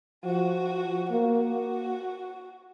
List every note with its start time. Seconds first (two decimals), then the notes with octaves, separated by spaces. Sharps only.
0.25 F3 F#4
1.11 A#3 F#4